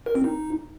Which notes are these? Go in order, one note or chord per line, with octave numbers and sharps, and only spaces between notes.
A#4
C4
D#4